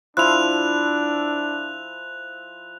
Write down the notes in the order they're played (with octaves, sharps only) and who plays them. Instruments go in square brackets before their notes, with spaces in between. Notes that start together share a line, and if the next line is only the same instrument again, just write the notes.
[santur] F3 E4 [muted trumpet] D4 [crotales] F#6 F7